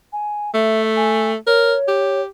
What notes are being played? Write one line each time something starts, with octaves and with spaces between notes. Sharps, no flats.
G#5
A3 E5
G#5
A#4 C#5
G4